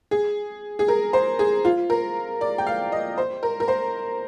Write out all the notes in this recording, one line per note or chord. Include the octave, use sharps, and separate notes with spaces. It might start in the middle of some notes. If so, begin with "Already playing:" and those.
G#4
G#4
A#4
C5
G#4
F4
A#4
D5
G5
F5
D#5
C5
A#4
A#4
C5